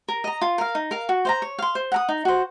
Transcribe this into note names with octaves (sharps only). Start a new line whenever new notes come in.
A#4
D#5 A#5
F4
A#4 F5
D#4
A#4 F5
F#4
C5 F5 A#5
C#5
F5 C6
C5
F#5 A#5 D#6
D#4
F#4 C5